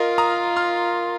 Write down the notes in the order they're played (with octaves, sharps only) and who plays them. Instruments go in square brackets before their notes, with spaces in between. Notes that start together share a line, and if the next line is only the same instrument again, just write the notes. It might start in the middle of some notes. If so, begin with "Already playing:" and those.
Already playing: [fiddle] F4 [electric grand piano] A#4 D#5
[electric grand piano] A#5 D#6
C6 F6